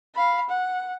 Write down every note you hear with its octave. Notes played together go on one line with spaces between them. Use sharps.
F5 B5
F#5